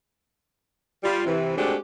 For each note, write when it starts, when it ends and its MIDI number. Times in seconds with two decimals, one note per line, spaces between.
1.04 1.23 55
1.04 1.23 65
1.26 1.56 48
1.26 1.56 52
1.56 1.75 56
1.56 1.75 57
1.56 1.75 60
1.56 1.75 62
1.56 1.75 66
1.56 1.75 67